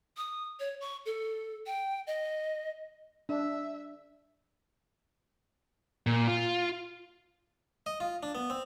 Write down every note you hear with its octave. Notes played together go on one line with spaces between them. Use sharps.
D#6
C#5
C#6
A4
G5
D#5
D4 E5
A#2
F4
D#5
F4
D4
B3
C4